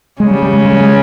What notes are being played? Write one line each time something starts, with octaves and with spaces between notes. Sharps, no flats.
C#3 G#3
G3
G3
G#3
G#3
G3
G#3